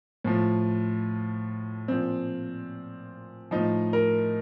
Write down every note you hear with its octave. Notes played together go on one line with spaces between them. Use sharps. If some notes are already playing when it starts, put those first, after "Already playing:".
A2 F3
A#2 F3 C4
A2 F3 D#4
A#4